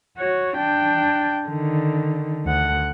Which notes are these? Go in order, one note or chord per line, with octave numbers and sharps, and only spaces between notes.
F#4 C#5
D4 G5
D3 D#3
D2 F#5